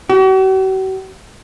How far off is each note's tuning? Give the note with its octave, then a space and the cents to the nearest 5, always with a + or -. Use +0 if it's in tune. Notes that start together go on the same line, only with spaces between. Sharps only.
F#4 +45